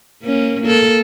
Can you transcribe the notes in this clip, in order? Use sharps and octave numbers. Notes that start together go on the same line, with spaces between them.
A#3 C#4
A#3 A4